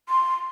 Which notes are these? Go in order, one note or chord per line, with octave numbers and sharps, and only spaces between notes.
C6